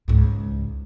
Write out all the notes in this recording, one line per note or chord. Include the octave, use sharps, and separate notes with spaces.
C#2 G#2